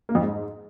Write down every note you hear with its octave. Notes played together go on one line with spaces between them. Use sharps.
A#3
F2
G#2